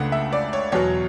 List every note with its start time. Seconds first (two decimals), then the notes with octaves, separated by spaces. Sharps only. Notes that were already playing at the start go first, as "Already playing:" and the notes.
Already playing: C#2 C#3 A3 D4 F#5
0.12 E5
0.33 D5
0.53 C#5
0.72 E2 B2 F#3 C#5